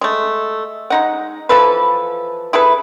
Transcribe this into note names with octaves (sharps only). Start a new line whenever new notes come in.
G#3 A3
G#3 D#4 F#5
E3 F3 A4 B4
E4 G#4 A4 B4